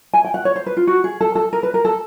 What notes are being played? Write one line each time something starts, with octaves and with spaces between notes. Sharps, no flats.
G#5
G5
F#5
C#5
C5
B4
F4
F#4
G#4
A4
A4
A#4
B4
A#4
A4